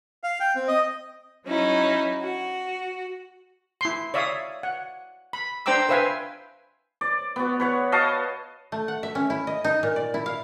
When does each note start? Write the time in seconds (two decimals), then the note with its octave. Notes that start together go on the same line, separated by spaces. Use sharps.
0.24 F5
0.40 G5
0.56 C4
0.68 D#5
1.47 F#3 C#4 D#4 E4
2.21 F#4
3.81 E4 C6
4.14 C#5 D5 E5 F5 D#6
4.63 F#5
5.33 B5
5.66 D4 C5 G5 A#5 D6 E6
5.89 B4 C5 E5 F5 G#5
7.01 D5
7.36 B3 F#4
7.60 B4 C#5 F#5
7.92 F#4 D#5 F5 A5
8.72 A3
8.88 F#5
9.03 E5
9.15 C#4
9.30 E4
9.47 D#5
9.64 D#4
9.83 A#2
9.96 D5
10.14 E4
10.26 F5